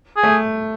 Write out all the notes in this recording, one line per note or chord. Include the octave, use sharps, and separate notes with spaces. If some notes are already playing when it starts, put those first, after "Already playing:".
G#4
A3